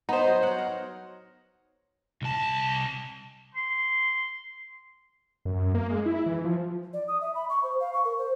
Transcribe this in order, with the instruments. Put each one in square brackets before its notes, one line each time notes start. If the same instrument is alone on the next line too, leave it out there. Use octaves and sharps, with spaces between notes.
[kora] B3 [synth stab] D#4 C5
[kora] F#3
C#5 F#5
A#4
[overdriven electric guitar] C2 A5
[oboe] C6
[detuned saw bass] F#2
A#3
G#3
E4
E3
F3
[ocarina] D5
D#6
E5
B5
C#6
C5
F5
C#6
A#4
C5